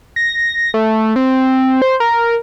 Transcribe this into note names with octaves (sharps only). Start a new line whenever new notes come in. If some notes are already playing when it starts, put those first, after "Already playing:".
A#6
A3
C4
C5
A#4